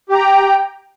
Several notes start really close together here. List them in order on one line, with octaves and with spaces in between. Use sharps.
G4 A#5 G5